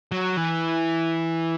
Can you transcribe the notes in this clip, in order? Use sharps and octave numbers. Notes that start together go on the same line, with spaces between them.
F#3
E3